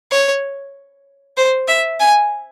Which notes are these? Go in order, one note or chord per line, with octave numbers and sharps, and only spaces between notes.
C#5
C5
E5
G#5